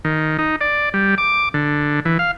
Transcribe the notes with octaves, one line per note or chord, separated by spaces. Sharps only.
D#3
D#4
D5
G3
D6
D3
E3
F5